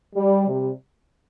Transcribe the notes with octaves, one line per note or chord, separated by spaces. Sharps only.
G3
C3 G3